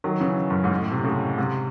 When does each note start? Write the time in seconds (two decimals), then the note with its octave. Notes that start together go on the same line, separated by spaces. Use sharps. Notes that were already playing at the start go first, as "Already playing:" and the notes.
0.04 D#3 F#3
0.21 C#3 E3
0.50 F#2
0.64 G#2
0.78 A2
0.91 C3
1.04 A2 C#3
1.38 G#2 C3